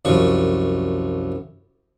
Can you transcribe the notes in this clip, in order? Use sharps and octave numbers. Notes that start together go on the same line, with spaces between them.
C2 F#2 F3 C#6